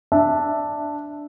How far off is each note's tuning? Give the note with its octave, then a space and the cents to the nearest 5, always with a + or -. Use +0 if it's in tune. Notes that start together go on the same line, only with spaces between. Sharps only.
D4 +0 E5 -5